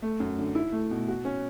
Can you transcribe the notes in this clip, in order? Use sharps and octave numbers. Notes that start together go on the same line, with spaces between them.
A3
F#2
D3
E4
A3
B2
F#4
C#4